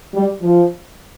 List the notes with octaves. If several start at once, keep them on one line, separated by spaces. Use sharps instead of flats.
G3
F3